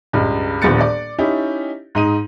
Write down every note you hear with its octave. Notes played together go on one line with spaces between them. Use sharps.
C#2 G2
D#1 A#1 A#2 B3 A6 C#7
D5
C#4 D#4 E4 G4
G#2 D#4 D#7